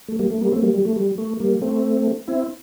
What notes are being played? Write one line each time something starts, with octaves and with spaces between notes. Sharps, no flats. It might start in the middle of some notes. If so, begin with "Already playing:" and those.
A3
G3 A#3
A3
G3 A#3
A3 C4
G3 A#3
G3
A3
G3
A3
G3 A#3
A3 C4
C4 E4